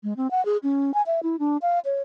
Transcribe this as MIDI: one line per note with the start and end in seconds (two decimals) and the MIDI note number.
0.04 0.13 56
0.17 0.30 60
0.31 0.44 78
0.45 0.57 68
0.63 0.94 61
0.94 1.02 80
1.07 1.20 76
1.23 1.36 64
1.39 1.57 62
1.62 1.79 77
1.85 2.02 73